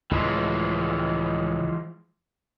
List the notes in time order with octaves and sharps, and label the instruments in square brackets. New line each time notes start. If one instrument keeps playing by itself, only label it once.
[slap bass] C#2 A2 [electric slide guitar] E3 F3 G#3